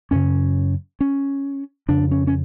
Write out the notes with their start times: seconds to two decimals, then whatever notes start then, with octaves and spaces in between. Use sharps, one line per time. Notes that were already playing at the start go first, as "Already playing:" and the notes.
0.11 F#2 C#3 C#4
1.00 C#4
1.88 F2 C#3 D4
2.11 C#4
2.27 C#4